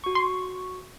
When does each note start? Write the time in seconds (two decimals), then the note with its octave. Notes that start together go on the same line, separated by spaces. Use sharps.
0.04 F#4 C#6
0.15 C6